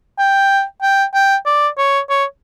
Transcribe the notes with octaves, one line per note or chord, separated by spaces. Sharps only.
G5
G5
G5
D5
C#5
C#5